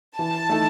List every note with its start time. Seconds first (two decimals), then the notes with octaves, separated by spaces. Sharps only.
0.19 E3 A5
0.49 A3 D#4 A4